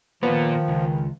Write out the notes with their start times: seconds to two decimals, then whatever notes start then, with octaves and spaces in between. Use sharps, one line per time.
0.23 A#2 D#3 F3 A#3 B3
0.68 C#2